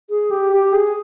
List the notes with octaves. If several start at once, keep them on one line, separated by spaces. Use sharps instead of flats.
G#4
G4
G4
G#4